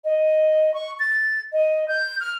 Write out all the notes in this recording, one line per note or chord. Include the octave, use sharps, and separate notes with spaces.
D#5
C#6
A6
D#5
G6
F6